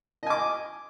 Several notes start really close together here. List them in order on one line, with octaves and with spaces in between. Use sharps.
D#5 G#5 D6